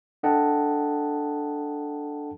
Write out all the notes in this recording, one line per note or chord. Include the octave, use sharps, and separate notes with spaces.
D4 A4 D#5 F#5 G5 A5